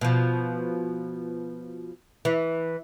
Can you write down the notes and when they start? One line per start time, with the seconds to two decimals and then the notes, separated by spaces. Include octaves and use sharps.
0.01 B2 F3
2.25 E3